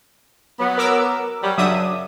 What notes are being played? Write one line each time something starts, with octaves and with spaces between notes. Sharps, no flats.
F#3 B3
A#4 D6 E6
F#3 G3
F#2 C#3 F#3 D4 E5 D#6